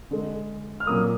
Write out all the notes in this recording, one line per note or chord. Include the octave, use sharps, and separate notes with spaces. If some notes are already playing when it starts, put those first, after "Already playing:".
D3 G#3
F6
A#2 F#3 A#3 D#6